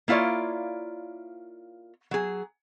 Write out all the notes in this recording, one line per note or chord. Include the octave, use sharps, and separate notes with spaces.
A#3 E4 F4 C#5 D5
F#3 G#4